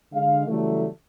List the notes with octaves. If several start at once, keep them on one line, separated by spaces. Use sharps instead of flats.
D3 G#3 F5
C#3 E3 F#3 G3 A3